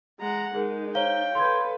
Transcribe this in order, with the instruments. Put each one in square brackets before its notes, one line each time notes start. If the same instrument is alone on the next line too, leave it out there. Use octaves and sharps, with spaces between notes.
[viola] G#3 F#5 [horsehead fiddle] A#5
[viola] G#3 [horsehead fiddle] D#4 [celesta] G#4 A#4
[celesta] C5 A#5 G7 [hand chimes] C#5 F5 [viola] G5
[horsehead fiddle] A4 B4 [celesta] C6 G6 G#6